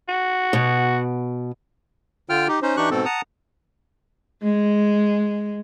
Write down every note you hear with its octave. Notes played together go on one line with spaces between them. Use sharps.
F#4
B2
D3 F4 G5 F6
D#4 G4
C#4 D#4 C5
E3 D4 D#4 G4 C#6 F#6
G#2 B2 C4 A4
F#5 A5 A#5 D#6
G#3